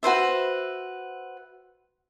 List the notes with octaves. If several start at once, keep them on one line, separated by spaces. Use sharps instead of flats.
F#4 B4 C5 E5